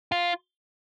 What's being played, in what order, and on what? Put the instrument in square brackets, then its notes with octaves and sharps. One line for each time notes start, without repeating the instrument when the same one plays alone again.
[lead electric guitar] F4